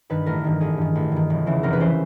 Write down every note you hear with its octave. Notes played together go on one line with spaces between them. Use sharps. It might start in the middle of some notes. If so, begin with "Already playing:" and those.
G2 D#3 B4
A1 A#4
G2 D#3
A1 G#4
G2 D#3
A1
G2 D#3
F1
E2 C#3 E3
F1 A#4
B4
C#3 E3 C5